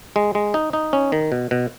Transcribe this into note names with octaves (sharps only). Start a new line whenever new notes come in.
G#3
G#3
D#4
D#4
C#4
D#3
B2
B2